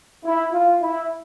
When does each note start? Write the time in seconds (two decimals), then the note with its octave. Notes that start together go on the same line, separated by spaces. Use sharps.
0.24 E4
0.52 F4
0.81 E4